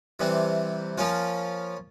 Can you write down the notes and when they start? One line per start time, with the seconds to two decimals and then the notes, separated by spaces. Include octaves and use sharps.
0.19 C3 E3 G3 C4
0.98 F3 A#3 C#4 F4